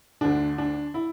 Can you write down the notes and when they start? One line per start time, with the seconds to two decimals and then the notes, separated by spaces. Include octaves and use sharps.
0.21 D2 D3 D4
0.58 D4
0.94 E4